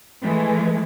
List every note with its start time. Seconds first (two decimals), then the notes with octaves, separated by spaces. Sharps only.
0.22 E3 G#3 A3